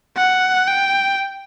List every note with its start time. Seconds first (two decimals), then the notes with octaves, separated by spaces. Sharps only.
0.16 F#5
0.67 G5